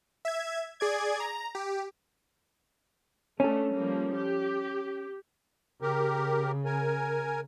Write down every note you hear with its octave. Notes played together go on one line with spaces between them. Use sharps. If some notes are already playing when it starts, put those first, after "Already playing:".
E5 G#6
G#4 D5 G#6
A#5
G4
A3 C#4 D4 A4
F3 G3 A#3
G4
C#3 G4 A#4
A#4 G#5